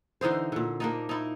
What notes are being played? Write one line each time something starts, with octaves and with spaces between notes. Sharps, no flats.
D3 E3 D#4 C5
A#2 D3
A#3 D4 D#4
D#4 E4